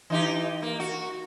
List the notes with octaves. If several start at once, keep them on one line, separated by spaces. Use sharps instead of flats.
E3 D#4 G4
A#3
F#4